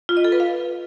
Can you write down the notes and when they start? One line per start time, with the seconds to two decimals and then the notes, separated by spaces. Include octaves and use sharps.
0.09 F4
0.17 D#5
0.24 A4
0.32 B4
0.40 F5